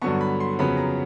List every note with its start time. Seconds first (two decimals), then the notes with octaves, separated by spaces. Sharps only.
0.02 G2 D3 F#3 B3 C#6
0.21 B5
0.40 C6
0.59 F2 C#3 F#3 B3 B5
0.77 A#5